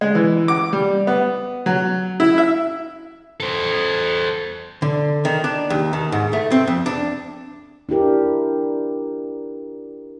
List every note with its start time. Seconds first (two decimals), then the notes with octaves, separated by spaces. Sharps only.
0.01 G#3
0.15 E3
0.48 D6
0.73 G3
1.07 B3
1.66 F#3
2.20 E4
2.38 E5
3.40 A4 C5
4.82 D3
5.25 D#3
5.44 D4
5.70 D#2
5.93 D#3
6.12 G#2
6.33 A3
6.52 C4
6.67 F2
6.86 D4
7.89 D4 E4 G4 A#4